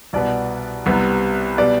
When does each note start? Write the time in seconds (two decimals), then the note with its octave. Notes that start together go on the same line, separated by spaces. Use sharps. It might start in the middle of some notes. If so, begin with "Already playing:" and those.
0.13 C2 B2 B3 D5
0.86 C2 C3 G3 B3
1.58 B2 G3 B3 D5